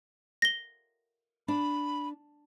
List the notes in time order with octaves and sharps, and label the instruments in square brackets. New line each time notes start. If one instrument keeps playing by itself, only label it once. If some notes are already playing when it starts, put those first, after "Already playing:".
[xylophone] A#6 G7
[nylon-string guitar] D4 [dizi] B5